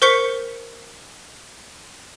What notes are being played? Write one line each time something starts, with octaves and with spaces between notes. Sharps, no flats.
A#4 C5 C#6 G6 B6 C#7